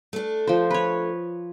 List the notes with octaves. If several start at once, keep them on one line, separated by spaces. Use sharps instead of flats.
A3 D4
F3 C5
B4 C#5